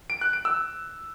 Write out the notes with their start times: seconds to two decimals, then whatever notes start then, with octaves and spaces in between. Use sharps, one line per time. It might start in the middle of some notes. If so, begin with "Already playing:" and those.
0.10 D7
0.21 F#6
0.33 D7
0.45 E6